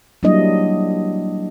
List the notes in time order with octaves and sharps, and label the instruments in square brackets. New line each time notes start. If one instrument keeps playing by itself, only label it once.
[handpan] F#3 G3 A#3 D4 E4 D#5